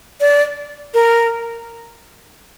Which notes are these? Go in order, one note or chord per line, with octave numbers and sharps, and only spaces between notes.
D5
A#4